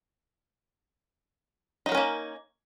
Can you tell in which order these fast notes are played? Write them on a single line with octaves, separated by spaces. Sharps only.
D#4 F#3 A#4 C#4 A#3